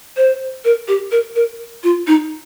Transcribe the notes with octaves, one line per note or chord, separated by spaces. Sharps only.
C5
A#4
G4
A#4
A#4
F4
D#4